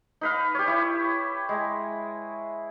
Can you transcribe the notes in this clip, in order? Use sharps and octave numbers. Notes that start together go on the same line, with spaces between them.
D#4 B4 F5
G4 C#5
E4
G#3